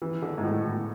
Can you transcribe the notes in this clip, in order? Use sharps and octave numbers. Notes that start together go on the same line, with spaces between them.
E3
D3
G#2
A2
A2